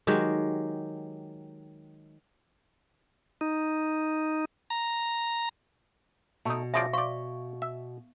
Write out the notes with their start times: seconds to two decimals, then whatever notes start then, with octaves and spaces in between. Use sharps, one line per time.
0.07 D#3 F#3 G#3 G4
3.41 D#4
4.70 A#5
6.45 B2 A3 D#4
6.74 C#3 F3 D5 E5
6.93 C5 D5 F5 C#6
7.62 E5